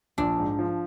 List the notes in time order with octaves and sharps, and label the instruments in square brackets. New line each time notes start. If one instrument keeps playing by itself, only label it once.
[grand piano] A#1 [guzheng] D4
[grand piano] G#2
F3